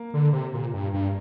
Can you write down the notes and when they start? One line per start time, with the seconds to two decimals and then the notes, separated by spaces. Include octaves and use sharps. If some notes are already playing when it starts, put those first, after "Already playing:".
Already playing: A#3
0.14 D3
0.33 C3
0.54 A#2
0.74 G2
0.94 G2